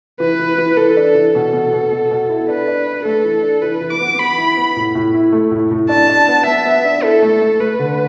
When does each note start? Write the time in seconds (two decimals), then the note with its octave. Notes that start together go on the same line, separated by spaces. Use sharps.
0.20 E3 B4
0.39 E3
0.58 E3
0.77 E3 A4
0.97 D4
1.15 E3
1.35 B2 A4
1.53 B2
1.73 B2
1.91 B2
2.11 B2
2.29 E4
2.48 D4 B4
2.68 D4
2.87 D4
3.05 A3 A4
3.24 E3
3.43 D4
3.62 E3 B4
3.81 E3
3.91 D6
4.00 B3
4.19 B3 B5
4.38 E4
4.57 B3
4.76 A2
4.95 A2
5.14 E4
5.33 A3
5.51 A2
5.71 A2
5.89 D4 A5
6.09 D4
6.28 B3
6.46 B3 E5
6.66 B3
6.85 D4
7.03 E4 A4
7.22 A3
7.42 A3
7.60 A3 B4
7.79 D3